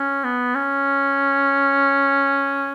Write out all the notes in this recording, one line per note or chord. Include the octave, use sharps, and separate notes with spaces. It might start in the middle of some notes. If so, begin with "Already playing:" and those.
Already playing: C#4
B3
C#4